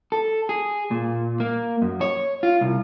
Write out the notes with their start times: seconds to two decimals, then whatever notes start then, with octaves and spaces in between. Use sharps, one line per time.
0.12 A4
0.49 G#4
0.91 A#2
1.40 A#3
1.82 F#2
2.01 C#5
2.43 F4
2.61 C2